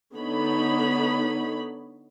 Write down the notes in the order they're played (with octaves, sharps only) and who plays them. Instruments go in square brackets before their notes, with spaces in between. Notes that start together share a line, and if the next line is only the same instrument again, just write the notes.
[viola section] D3 B3 D#4 C#5 B5